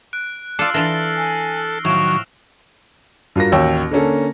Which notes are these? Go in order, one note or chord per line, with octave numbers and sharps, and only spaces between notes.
F#6 D7
F4 A4 D5 A5 E6 F6 C7
E3 D4 F4 A4 A#6 C7 G7
G#5
A2 D#3 F3 F#3 C#6 D7 E7 F7
G2 F4 F#4 A#4 A#6
A1 D#2 F#4 C#5 G5 E6
D3 A#3 C#4 A4